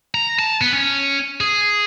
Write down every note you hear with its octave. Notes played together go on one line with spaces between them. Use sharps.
A#5
A5
B3
C#4
G#4